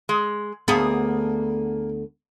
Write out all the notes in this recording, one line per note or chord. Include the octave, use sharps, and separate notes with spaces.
G#3
D2 A#3 B3 G#4